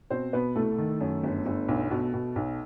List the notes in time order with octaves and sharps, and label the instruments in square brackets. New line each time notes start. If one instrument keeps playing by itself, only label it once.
[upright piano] B2 C4 C5
B2 B3 B4
C2 A3 A4
D#3
F#2
G1
G1
B1
B2
B2
B1